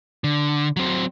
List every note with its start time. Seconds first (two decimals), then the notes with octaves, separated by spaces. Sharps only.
0.24 D3
0.77 F#3 C4